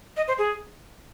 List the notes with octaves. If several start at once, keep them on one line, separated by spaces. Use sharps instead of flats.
D#5
C5
G#4